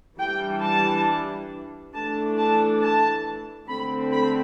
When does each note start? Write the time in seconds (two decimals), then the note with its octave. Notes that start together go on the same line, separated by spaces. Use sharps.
0.20 E3 G3 D4 G5
0.63 A5
1.94 E3 A3 D4 A5
2.38 A5
2.82 A5
3.69 D3 A3 C4 B5
4.13 B5